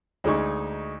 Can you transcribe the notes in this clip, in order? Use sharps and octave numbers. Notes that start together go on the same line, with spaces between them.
D2 G#3 D#4 C#6